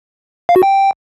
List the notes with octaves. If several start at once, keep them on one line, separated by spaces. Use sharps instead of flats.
F5
F#4
G5